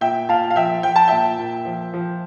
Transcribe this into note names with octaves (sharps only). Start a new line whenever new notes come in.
A#2 E5 G5
A#2 F5 A5
F5
F3 E5 G5
F3 G5
A5
A#2 E5 G5
A#2
F3
F3